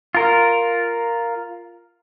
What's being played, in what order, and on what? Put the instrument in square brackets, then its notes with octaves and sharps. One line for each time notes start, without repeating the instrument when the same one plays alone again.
[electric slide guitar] F4 A#4